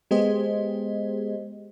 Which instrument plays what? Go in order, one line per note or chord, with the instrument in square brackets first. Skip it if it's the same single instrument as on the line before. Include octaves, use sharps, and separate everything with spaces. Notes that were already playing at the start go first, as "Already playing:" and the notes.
[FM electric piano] G#3 B3 G4 G#4 C5 D#5